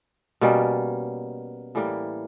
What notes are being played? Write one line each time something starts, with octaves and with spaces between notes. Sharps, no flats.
B2 G3 A#3 C#4
A2 E3 G3 A#3